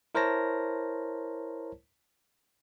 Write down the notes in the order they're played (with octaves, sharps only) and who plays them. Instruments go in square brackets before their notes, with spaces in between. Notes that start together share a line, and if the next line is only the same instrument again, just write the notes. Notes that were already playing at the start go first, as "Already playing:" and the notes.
[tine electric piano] E4 A#4 C5 C#5 A5 A#6